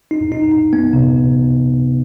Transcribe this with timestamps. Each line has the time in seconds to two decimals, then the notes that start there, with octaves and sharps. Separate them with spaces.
0.11 D#4
0.32 D#4
0.51 D#4
0.73 B3
0.93 C3